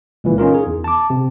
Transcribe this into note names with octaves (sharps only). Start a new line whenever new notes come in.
C#2 A#2 E3
C#4 D#4 F4 A#4
G#4
E2
A5 D6
C3